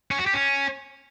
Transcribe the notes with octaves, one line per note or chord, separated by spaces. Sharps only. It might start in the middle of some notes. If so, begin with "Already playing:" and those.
C#4
F#4
G4
C#4